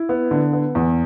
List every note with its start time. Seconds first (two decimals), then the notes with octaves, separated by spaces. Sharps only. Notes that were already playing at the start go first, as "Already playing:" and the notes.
Already playing: E4
0.09 B3
0.31 D3
0.53 B3
0.75 E2